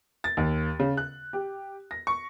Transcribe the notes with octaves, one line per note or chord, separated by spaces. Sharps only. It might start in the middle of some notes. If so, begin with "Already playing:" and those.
A6
D#2
C#3
F#6
G4
A#6
C#6